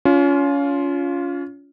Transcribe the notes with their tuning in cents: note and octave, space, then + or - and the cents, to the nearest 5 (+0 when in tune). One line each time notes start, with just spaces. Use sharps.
C#4 +30 F4 +0